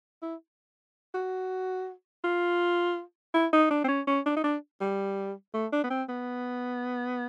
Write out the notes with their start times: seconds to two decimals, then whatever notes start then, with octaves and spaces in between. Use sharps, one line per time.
0.22 E4
1.15 F#4
2.24 F4
3.34 E4
3.53 D#4
3.71 D4
3.84 C4
3.89 C#4
4.07 C#4
4.26 D4
4.37 D#4
4.44 D4
4.81 G3
5.54 A3
5.73 D4
5.84 B3
5.91 C4
6.09 B3